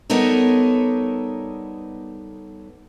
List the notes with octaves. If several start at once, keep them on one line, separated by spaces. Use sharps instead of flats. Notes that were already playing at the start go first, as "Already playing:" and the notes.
G3 B3 D#4 A4 A#4 C#5